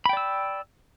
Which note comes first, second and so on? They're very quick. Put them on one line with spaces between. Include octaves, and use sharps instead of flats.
B5 G5 D5 E6